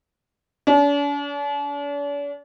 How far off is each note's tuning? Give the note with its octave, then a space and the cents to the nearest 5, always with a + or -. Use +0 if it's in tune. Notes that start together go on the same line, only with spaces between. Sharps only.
D4 -45